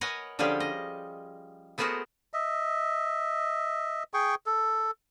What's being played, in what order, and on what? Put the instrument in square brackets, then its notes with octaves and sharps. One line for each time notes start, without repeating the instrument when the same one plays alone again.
[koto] A#4 B4 C#5 D#5 F#5 G#5
D3 F3 G3 C#4 G4 G#4
D#5
A3 B3 F#4 G#4 A#4 C5
[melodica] D#5 E5
G#4 G5 C#6
A4